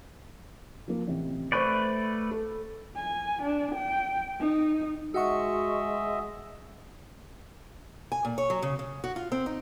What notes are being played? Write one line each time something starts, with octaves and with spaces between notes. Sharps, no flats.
F3 A#3
A1 C3
A3 B4 C5 D5 C#6 G6
A4
G#5
D4
G5
D#4
G#3 F#4 D#5 E5 F#5 C#6
G#5
A#2
C#5
F#3
C#3
C#3
F#4
F4
C4
D#4